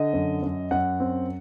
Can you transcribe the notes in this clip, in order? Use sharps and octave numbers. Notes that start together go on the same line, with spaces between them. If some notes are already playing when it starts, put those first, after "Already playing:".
Already playing: D3 D#5
F#2
F#2
F#2 F#5
C4